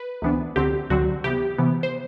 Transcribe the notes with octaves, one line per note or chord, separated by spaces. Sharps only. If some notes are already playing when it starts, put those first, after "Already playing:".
Already playing: B4
D2 C3 E3 B3 D4
D2 D3 F#3 C4 G4
D2 D3 F#3 C4 F#4
C3 E3 B3 G4
C3 E3 B3
C5